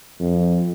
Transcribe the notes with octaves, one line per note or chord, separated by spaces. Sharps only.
F2